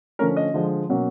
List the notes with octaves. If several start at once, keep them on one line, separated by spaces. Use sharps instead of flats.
D3 F3 A3 C#4 A#4
D#5
D3 F3 G#3
B2 F#3 A#3 C#4